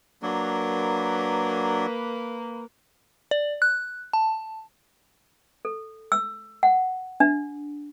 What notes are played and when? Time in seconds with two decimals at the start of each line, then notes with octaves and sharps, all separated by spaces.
0.23 F#3 A#3 D4 B4
3.31 D5
3.62 F#6
4.13 A5
5.65 A4
6.12 E6
6.63 F#5
7.20 D4